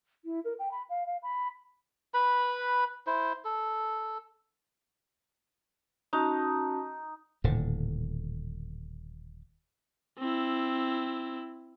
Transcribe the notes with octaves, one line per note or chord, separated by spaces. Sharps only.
E4
A#4
G5
B5
F5
F5
B5
B4 B5
E4 C5
A4
C#4 D#4 F#4 A5
D#1 A2 D3
C4 E4